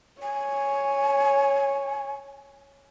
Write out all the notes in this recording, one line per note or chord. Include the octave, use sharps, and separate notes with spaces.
C#5 G#5